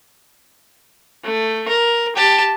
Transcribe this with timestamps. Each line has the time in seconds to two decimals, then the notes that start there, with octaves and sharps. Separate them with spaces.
1.24 A3
1.68 A#4
2.16 G4 A5